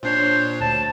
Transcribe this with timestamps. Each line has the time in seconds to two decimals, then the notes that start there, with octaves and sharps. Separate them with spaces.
0.03 A#2 D4 C5 C#5
0.61 D2 A5